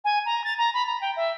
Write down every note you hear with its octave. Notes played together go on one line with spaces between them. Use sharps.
G#5
A#5
A6
A#5
B5
A#5
G5
E5